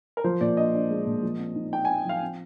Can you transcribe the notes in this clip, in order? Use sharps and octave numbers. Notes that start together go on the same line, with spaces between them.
A#4
F3 C5
A#2 D5
D4 D#5
D4
G#3
A#2
F3
C4
D#4
D#4 G5
C4 G#5
F3 F5
C4